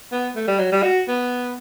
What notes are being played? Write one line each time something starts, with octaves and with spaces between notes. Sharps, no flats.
B3
A3
G3
F#3
G3
F#4
B3